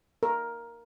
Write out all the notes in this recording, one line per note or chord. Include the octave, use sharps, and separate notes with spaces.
A#4